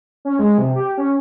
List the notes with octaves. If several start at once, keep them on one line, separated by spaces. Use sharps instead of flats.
C#4
G#3
C3
G4
C#4